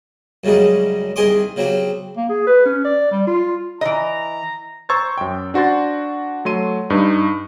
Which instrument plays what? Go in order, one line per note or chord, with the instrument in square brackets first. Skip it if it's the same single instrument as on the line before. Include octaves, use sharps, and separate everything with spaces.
[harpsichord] F#2 C#3 G3 G#3 D#4
C2 D#3 G#4 D#5 C6 D6
C#3 F#3 C4 G4
[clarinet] A#3
G#4
B4
C#4
D5
G3
F4
[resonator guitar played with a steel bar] E3 D#5 [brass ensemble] A#5
[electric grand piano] C5 A#5 C#6 E6 G#6 A6
F#2 G5
D4 F#4 C5 C6 A6
F#3 A3 C6 D#7
G2 D#4